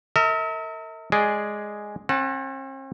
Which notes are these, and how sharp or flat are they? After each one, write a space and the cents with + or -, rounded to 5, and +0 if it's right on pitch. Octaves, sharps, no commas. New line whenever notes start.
A#4 -40 E5 -40
G#3 +0 G#4 +0 D5 +0
C4 +45 F#5 +5 A5 +0